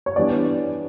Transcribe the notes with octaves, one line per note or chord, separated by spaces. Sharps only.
C#5
E3 G3 B3 D4 D5